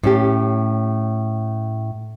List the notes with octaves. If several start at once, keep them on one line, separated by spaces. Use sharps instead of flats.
A2 C#4 G4